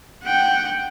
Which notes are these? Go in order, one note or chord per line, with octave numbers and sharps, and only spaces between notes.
F#5 G5